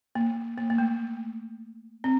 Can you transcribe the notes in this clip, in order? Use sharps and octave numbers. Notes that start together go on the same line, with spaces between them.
A#3
A#3
A#3
A3
C4